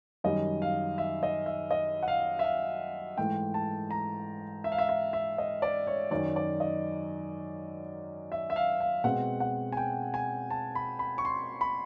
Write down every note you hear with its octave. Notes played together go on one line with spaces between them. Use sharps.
F#2 D#3 G3 D#5
F5
E5
D#5
E5
D#5
F#5
F5
E5
F5
G#2 E3 A3 G5
A5
A#5
E5
F5
E5
E5
E5
D#5
D5
C#5
F#2 D#3 F#3 D5
D5
D#5
E5
E5
F5
F5
B2 G#3 C4 F#5
F#5
G#5
G5
G#5
A5
B5
B5
C#6
C6
B5